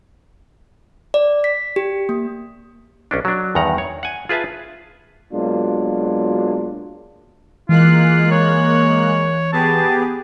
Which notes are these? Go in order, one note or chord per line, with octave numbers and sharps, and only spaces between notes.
D5
B6
G4
A#3
B1 C#4 D4
F#3 D4
E2 G2 D#3 F#5 A#5
C#5
F#5 G#5
F4 G#4 B4 E5 A5
B2 F#3 G#3 A#3 D4 F4
E3 G#3 A#3 F4 F#6
C#5
B3 G4 G#4 A5